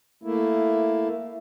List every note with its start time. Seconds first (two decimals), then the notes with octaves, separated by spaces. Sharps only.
0.23 A3 A#3 E4